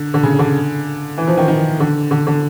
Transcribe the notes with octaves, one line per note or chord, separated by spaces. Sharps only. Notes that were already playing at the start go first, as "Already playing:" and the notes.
Already playing: D3
D3
C#3
D3
E3
F3
D#3
D#3
D3
D3
D3